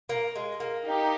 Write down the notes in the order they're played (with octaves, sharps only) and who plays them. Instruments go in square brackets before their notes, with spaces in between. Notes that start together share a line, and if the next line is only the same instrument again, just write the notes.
[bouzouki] A#3
G#3
A#3
[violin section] D#4 G4